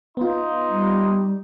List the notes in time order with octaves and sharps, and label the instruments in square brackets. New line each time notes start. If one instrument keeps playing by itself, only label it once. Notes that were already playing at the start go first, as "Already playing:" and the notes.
[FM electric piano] B3 F4 [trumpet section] D#4 C6
[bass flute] G3